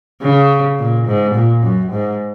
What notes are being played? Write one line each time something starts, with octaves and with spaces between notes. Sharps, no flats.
C#3
A#2
G#2
A#2
F#2
G#2